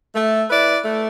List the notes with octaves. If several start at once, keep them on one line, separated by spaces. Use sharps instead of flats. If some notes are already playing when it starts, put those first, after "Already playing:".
A3
E4 B4 D5
A3